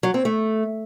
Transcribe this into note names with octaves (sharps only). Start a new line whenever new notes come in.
F#3
C4
A3